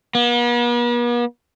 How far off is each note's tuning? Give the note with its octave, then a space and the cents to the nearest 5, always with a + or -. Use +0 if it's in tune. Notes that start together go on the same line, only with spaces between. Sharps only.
B3 -45